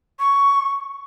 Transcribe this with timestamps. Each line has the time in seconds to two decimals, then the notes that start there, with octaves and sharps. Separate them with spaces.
0.20 C#6